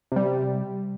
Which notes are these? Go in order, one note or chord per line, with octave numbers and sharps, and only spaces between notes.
C3 G3